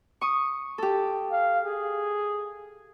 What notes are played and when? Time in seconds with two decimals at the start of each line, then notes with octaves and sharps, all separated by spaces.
0.21 C#6 D#6
0.78 G4 A4
1.31 F5
1.65 G#4